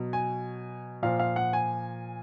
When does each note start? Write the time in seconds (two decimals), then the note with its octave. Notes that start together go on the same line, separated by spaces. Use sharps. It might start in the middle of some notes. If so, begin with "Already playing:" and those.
Already playing: B2 F#3
0.13 G#5
1.03 A#2 F3 F5
1.20 F5
1.36 F#5
1.53 G#5